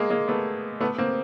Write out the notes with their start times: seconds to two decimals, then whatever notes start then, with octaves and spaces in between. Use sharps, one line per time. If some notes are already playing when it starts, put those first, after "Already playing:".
Already playing: G#3 A#3
0.10 G#3 A#3
0.28 A3 B3
0.80 A3 B3
0.98 A#3 C4